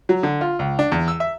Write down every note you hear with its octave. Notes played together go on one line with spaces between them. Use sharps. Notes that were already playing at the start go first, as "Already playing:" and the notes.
F#3
D3
F4
C#2
D4
E2
E6
E5